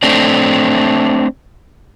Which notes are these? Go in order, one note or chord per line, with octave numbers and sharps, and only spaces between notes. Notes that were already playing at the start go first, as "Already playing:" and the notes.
A3 C4 D4